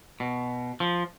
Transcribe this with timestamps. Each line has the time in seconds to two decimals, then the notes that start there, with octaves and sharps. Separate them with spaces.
0.20 B2
0.80 F3